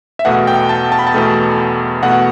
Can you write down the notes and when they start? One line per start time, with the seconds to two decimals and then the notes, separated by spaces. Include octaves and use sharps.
0.19 E5
0.25 E2 B2 A3 F#5
0.47 G5
0.69 A5
0.92 A5
0.99 B5
1.07 A5
1.14 E2 B2 A3
2.03 E2 B2 A3 F#5